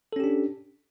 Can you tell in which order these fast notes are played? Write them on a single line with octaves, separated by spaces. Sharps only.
A4 C#4 G4 D4